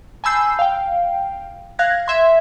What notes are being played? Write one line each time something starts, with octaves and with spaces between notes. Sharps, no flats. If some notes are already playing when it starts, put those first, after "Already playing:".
G#5 A5 B5 E6 G6 C7
F5 G5
F5 F#6 G#6 A#6
E5 C6 G#6